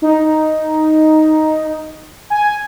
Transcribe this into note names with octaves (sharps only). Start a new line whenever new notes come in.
D#4
G#5